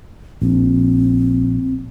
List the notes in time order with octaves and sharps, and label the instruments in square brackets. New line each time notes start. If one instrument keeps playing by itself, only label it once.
[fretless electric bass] A#1 [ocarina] C4